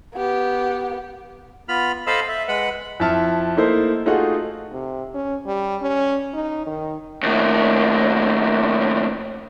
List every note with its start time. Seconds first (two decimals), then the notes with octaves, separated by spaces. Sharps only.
0.15 B3 G4
1.69 B3 F4 B5 F6
2.07 A4 C5 D#5 F5 B5 E6
2.29 E5
2.48 G#3 B4 F#5 B5
3.00 F2 E4 E5 A5 F6
3.57 A3 A#3 D#4 E4 A4 C5
4.06 A3 D#4 F4 F#4 G#4 F#5
4.71 C3
5.14 C#4
5.47 G3
5.82 C#4
6.34 D#4
6.67 D#3
7.23 D#2 A2